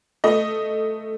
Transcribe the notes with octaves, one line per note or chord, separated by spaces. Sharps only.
A3 D#5